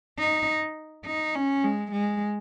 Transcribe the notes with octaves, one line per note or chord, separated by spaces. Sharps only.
D#4
D#4
C#4
G#3
G#3